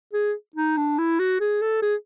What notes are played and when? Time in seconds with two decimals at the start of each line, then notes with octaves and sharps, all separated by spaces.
0.13 G#4
0.56 D#4
0.77 D4
0.98 E4
1.19 F#4
1.40 G#4
1.61 A4
1.82 G#4